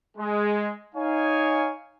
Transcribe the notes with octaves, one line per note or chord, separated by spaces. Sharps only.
G#3
D#4 C#5 F5 G#5